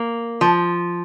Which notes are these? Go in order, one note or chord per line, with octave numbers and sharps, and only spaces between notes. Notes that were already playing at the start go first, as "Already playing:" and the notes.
Already playing: A#3
F3